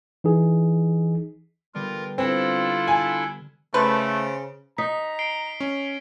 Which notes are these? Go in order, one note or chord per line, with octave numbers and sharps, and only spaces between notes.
E3 D#4 G#4
D3 G3 B3 F4 A#4
C4 D4 E4 F4 A4
G#5 E6 F6 B6
C#3 A3 B4 C5
D#4 A#5 B6
C7 D7 G7
C#4